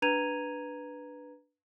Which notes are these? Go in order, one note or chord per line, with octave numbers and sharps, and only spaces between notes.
D4 B4 A#5 G#6 D#7 F7